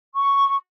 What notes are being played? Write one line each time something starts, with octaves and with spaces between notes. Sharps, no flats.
C#6